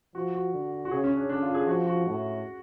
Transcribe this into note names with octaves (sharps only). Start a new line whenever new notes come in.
F3 F#4
F#4
D3
F#4
C#3 G#4
C#4
D4
D3 D4
F4
G#4
F3 F#4
F#4
A2